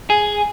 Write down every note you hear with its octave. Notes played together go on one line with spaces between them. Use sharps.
G#4